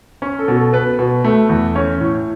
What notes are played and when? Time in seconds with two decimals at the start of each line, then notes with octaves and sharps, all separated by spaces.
0.22 C#4
0.39 A4
0.48 B2
0.56 A4
0.72 B3 B4
0.99 B2
1.24 A3
1.49 E2
1.75 C#4 C#5
2.00 A2